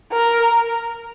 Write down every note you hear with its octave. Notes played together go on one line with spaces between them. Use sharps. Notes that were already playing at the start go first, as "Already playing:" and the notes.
A#4